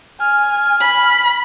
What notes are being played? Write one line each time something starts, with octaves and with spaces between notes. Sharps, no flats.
G#5 F6
B5